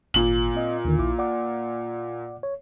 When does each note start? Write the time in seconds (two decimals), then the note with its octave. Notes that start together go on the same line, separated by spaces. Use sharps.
0.14 G#1 A#2 F#7
0.55 C4 D#5
0.85 D#2 D3 D#3
0.98 A#1 E4 D6
1.18 D5 F#5 D6
2.43 C#5